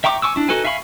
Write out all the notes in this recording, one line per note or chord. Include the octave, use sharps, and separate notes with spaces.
E5 G5 A#5 C#6 D6
G#5 C#6 D6 E6
D4 E4
D#4 F#4 A4 B4 G#5
E5 F5 G#5 B5 C#6